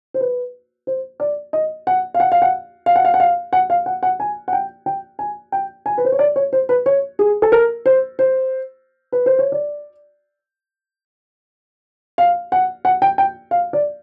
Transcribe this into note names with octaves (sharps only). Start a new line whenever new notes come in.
C5
B4
C5
D5
D#5
F#5
F5
F#5
F5
F#5
F5
F#5
F5
F#5
F5
F#5
F5
F#5
F#5
G#5
F#5
G5
G5
G#5
G5
G#5
B4
C5
C#5
D5
C#5
C5
B4
C#5
G#4
A4
A#4
C5
C5
B4
C5
C#5
D5
F5
F#5
F#5
G5
G5
F5
D5